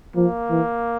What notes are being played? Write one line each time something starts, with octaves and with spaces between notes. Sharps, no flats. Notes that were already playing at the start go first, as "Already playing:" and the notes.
F3 A#3
E3